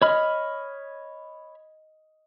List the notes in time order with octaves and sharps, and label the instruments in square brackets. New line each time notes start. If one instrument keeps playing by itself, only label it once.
[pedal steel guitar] C#5 B5 F6 [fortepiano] D#5